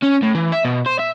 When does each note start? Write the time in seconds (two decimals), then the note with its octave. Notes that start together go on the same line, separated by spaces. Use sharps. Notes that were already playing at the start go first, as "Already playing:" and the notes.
0.03 C#4
0.23 A2
0.35 E3
0.52 E5
0.65 B2
0.86 C5
0.99 E5